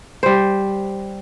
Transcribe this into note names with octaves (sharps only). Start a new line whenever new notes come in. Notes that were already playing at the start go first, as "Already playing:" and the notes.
G3 C5